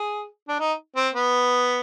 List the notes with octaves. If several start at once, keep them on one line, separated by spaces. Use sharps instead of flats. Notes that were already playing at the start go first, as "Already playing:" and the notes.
Already playing: G#4
D4
D#4
C4
B3